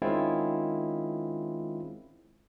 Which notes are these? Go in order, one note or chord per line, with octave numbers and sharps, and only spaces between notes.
D#3 G#3 C4 C#4 E4 F4